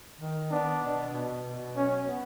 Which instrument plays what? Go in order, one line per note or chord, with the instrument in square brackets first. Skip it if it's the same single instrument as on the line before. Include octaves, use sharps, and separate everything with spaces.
[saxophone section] D#3
[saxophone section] B3 [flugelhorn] D4
[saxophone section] B2
B2
B2
[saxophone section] F#3 [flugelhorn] C#4
[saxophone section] B3